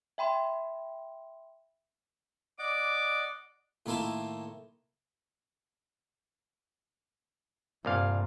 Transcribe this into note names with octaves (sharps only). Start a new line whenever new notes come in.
E5 G5 B5 C6
D5 D#5 F#5 D6
A2 D#3 A#3 E4 F4 A5
C2 G2 A#2 F5